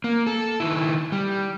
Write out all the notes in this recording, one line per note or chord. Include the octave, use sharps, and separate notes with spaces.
A#3
A4
D#3 E4
G3